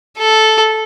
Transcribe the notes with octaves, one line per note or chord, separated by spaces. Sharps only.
A4